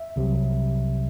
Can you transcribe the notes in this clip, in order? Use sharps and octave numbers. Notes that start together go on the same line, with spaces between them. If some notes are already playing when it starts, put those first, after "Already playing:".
Already playing: E5
C2 C3 F#3